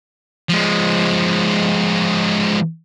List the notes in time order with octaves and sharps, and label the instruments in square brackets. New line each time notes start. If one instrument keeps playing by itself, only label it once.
[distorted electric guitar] F3 G#3